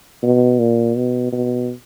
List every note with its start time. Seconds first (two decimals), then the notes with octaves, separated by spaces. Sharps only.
0.23 B2
0.59 A#2
0.96 B2
1.32 B2